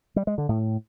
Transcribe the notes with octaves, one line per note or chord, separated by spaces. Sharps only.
G3
G#3
D3
A2